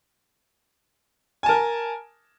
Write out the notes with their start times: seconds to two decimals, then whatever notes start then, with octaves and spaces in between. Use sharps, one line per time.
1.43 G#5
1.46 A5
1.49 A#4